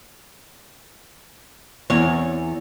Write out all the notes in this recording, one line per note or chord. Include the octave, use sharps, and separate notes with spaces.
E2 C#5